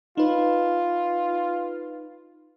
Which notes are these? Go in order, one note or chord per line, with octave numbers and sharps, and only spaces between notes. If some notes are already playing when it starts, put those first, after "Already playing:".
D#4 F4 B4